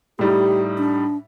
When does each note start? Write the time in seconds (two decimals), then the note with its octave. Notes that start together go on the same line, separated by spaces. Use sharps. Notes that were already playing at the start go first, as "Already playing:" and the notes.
0.19 A2 G3 D#4 G4
0.78 D4